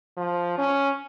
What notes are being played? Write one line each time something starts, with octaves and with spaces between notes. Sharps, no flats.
F3
C#4